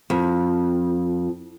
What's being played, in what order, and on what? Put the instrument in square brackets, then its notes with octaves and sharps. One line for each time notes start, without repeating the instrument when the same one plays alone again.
[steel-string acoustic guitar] F2